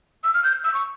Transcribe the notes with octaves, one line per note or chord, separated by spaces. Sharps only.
E6
F6
G6
E6
C#6